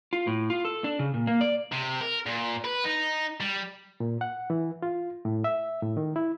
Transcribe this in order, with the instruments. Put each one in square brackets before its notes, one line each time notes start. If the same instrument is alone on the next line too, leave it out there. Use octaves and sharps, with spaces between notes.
[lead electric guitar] F4
A2
F4
A4
D4
C#3
A#2
A#3
D5
[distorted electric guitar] C3
A#4
A#2
B4
D#4
G3
[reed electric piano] A#2
F#5
E3
F4
A2
E5
A2
D#3
E4